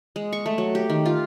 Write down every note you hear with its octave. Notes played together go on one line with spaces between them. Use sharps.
G#3
C#6
A3
F#3
G4
D#3
F4